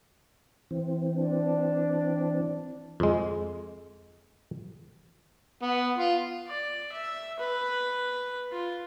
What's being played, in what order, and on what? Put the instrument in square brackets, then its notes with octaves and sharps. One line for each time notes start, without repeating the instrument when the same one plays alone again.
[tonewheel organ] E3 C4
[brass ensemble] D4
[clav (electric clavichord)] F2 G#3
[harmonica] B3
F4
[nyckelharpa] D5
E5
B4
F4